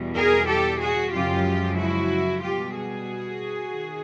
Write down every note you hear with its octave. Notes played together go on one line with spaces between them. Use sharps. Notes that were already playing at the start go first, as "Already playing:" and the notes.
Already playing: E2 B2 G3
G#4 A#4
G4 A4
F#4 G#4
F#2 C#3 F3 G#3 F4 G4
E4 F#4
B2 G3 F4 G4
F#4 G#4
D#3